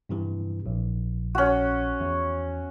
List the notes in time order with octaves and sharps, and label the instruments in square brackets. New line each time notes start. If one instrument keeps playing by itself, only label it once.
[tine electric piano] G2 C3 E3
A#1
[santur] C#4 F#4
[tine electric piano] E2